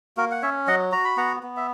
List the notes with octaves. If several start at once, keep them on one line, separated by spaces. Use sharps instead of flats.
A#3 F#4 A#4
F#5
C#4 C#5 E5
F#3 D#5 F#5
F#4 A#5
B5
B3 F#5 A#5
B3
E5